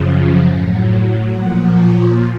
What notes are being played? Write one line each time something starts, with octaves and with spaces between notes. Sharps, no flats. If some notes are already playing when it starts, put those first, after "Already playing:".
Already playing: F#2 C#3 F3
A2 F#3
A#2 F3 F#5
C#5